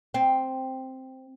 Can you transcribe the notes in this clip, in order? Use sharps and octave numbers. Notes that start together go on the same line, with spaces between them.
C4